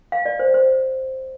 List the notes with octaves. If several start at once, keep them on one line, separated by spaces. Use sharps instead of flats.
F5
D5
C5
C5